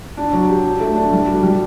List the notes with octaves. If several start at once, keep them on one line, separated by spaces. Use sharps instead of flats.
D4
F#3
G4
D4
A3
D4
G3
F#4
G3